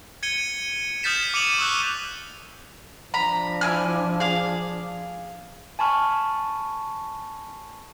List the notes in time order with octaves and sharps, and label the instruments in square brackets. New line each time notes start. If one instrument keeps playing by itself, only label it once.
[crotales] G#6 C#7 D#7 G7
D#6 F6 G6 A6 B6 E7
D6 C#7 D#7 F7 F#7
C#6 D#6 E6 F#6
[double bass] F3 D4 [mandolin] A#5 B5
[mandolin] E4 G#5 F6
G#4 F5
[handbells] G#5 A5 B5 C#6 F6